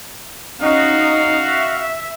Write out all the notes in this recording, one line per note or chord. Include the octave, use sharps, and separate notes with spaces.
C#4 D#4 F#4 D#5 F5
E5